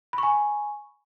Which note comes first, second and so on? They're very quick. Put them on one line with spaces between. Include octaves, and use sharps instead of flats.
B5 C#6 G#5